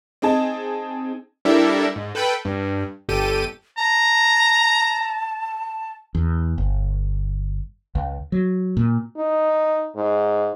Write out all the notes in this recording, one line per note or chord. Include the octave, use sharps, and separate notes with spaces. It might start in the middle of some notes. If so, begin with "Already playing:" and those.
C4 D#4 G#4 A5
G3 D4 E4 A4 A#4 E5
G#2
A4 B4 G5 B5
G2
G1 G4 A4 D#7
A5 A#5
E2
G1
C#2
F#3
A#2
D#4
G#2